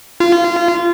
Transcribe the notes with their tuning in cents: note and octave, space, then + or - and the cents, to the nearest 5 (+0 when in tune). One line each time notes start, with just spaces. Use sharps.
F4 -25